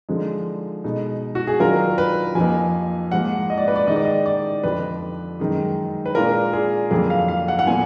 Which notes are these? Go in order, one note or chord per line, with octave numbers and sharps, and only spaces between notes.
D3 F3 G#3 D#4
B2 G#3 D#4
F#4
G#4
D#3 F#3 D4 F4 A#4
B4
F2 F3 A#3 D#4 G#5
G#2 F3 A#3 F#5
D#5
D5
B4
D5
D#3 G#3 D#4 D#5
D5
D#5
D5
F2 D3 F3 B4
F#2 D#3 G#3 D#4
B4
A#2 G#3 D4 F4 A#4
G#4
F2 D3 F#3 A#3 G#4
F5
F5
F#5
F#5
A#2 F#3 B3 F4 G#5